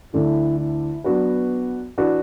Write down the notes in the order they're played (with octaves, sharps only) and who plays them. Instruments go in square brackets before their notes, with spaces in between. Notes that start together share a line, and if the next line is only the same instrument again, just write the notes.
[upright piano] D2 D3 A3 [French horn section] E4
[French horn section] E4
[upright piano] F#3 D4 F#4 B4 [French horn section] B3
[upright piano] E3 D4 F#4 B4